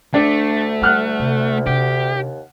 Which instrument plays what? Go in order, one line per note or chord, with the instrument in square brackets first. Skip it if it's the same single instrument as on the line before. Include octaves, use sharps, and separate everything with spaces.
[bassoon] D2 [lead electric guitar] A3 [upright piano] D4
[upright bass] G3 [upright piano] F#5 F6 F#6
[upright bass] C3
[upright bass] C3 D4 [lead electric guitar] G4
[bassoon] D#2